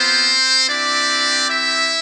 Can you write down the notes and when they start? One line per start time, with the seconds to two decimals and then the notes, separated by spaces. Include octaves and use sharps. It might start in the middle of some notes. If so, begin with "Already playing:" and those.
Already playing: B3 C4 F4 C5
0.67 C4 D4 E4 G4 D5
1.49 E4 E5